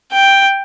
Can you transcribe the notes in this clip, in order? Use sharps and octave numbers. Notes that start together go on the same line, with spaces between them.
G5